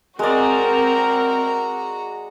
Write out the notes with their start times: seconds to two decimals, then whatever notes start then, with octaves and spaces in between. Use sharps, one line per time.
0.19 G#3 C4 F#4 A#4 D5 A#5